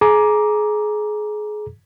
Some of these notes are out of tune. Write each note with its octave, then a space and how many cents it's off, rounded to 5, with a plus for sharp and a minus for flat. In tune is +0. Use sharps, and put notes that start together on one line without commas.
G#4 +30 A#5 +15 D6 +0